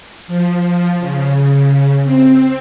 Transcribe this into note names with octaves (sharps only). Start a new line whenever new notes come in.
F3
C#3
C4